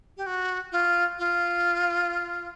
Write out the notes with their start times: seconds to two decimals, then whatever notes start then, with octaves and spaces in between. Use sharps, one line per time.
0.17 G4
0.26 F#4
0.72 F4
1.19 F4